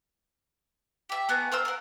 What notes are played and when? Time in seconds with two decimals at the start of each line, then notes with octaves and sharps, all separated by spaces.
1.09 G4 E5
1.29 A3 B3 G#4 A#5
1.52 A#4 C5 F5 E6
1.65 A#4 F#5